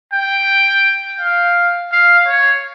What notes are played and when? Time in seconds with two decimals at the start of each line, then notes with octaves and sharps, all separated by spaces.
0.13 G5
1.20 F5
1.92 F5
2.27 C#5